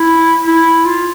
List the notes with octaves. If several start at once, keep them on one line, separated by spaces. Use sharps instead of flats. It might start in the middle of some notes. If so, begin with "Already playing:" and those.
Already playing: E4
E4
F4